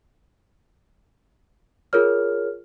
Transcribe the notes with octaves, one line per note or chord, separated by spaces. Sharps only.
F4 G#4 A#4 C#5 F6